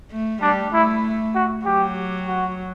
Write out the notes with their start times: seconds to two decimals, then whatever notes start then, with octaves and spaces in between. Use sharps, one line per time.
0.11 A3
0.42 G3 D4
0.73 A3 E4
1.35 F#4
1.65 F#3 G4
2.27 F#4